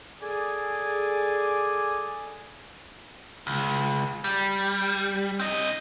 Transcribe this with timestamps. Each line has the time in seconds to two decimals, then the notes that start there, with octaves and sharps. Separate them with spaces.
0.22 G#4 A4 D5 G#5
3.47 C#2
4.24 G3
5.40 C4 D#5